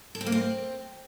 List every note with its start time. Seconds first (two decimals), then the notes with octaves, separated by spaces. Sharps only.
0.15 A4
0.21 C4
0.26 A#3
0.32 C4